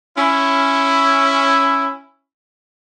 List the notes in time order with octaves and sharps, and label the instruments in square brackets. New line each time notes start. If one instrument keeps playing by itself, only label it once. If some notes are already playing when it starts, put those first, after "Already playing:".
[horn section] C#4 E4